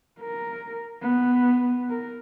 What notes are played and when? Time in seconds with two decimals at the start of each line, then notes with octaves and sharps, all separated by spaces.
0.21 A#4
1.02 B3
1.89 A#4